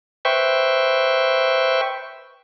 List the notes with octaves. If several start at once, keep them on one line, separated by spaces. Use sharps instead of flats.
B4 C5 E5 G5 C#6